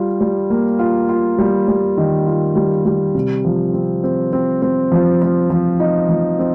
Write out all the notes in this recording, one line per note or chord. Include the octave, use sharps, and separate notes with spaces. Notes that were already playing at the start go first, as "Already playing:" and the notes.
Already playing: G3 F4
G3
A#3
F4
F4
G3
G3
D#3
F4
G3
G3
C3
F3
C4
C4
C4
C4
F3
F3
F3
D#4
F3
C4